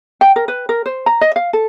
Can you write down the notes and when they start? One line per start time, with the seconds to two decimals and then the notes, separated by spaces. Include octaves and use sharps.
0.21 G5
0.36 A#4
0.48 B4
0.69 A#4
0.86 C5
1.06 A#5
1.21 D#5
1.36 F5
1.53 A4